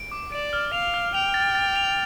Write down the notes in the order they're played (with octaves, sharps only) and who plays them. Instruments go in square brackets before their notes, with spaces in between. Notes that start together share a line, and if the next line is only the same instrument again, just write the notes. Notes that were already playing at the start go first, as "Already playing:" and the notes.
Already playing: [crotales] D7
D6
[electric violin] D5 [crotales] D7
[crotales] F6
[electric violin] F5 [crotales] F7
[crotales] F6
[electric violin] G5 [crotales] F7
[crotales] A6
A6
F7